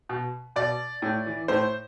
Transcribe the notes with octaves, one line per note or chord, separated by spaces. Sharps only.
B2
B2 D5
A2
E3
A2 C5